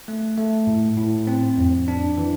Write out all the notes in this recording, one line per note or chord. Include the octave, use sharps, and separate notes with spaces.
A3
A3
A2
A2
C4
F2
D4
E3